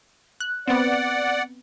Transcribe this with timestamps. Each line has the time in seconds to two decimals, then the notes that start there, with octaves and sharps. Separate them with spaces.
0.40 F#6
0.68 B3 C4 D5 F#5